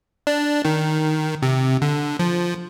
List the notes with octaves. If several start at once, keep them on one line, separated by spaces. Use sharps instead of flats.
D4
D#3
C3
D3
F3